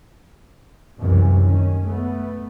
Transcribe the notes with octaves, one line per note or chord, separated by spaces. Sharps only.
F#1 C2 F#2 C3 E3 C#4
D#3 C#4
A3 B3